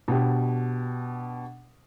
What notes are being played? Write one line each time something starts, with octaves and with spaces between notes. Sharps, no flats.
B2 D4 G4